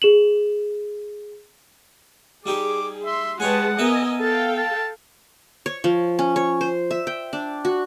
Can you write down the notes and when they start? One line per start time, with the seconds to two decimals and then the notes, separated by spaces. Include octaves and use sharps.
0.02 G#4 E7 F#7
2.46 G3 D#4 G4 G#4 D6
3.06 E5 C6
3.40 G#3 G4 B4 C#5 F#5 G#5 A5
3.79 B3 A#4 B4 D#5 E5 G#5
4.21 A4 F5 G5 A5
4.57 A5
5.66 C#5
5.84 F3
6.19 C#4
6.36 C#5
6.61 C5
6.91 E5
7.07 G5
7.33 D4
7.65 F#4